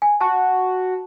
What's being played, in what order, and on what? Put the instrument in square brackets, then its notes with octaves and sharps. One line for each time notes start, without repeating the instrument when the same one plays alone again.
[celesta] G#5
[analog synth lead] F#4 [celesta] A5